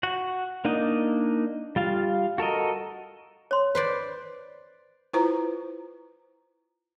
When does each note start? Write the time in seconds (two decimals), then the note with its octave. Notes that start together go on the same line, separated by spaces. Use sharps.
0.03 F#4 F#5
0.65 A#3 D4 D#4 D#5
1.76 G3 F4 F5
2.38 F#4 A4 A#4 D#5
3.51 C#5 C6
3.75 B4 C5 D5
5.13 E4 F4 B4 C5 A#5